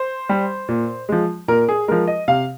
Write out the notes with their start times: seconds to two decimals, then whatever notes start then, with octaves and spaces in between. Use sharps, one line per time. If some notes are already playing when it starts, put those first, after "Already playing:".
Already playing: C5
0.29 G3
0.68 A#2
1.09 F3 G#3
1.48 A#2 A#4
1.69 G#4
1.88 F3 G#3 A#4
2.07 D#5
2.28 C3 F5